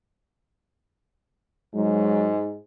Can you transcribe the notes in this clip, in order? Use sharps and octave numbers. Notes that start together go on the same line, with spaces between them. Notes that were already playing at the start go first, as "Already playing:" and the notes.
G#2 F#3 G#3